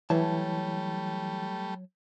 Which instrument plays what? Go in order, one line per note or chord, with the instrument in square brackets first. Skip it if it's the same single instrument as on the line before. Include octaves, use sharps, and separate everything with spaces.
[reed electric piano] E3 [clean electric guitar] F#3 C#5 A5 [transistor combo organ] G3 A3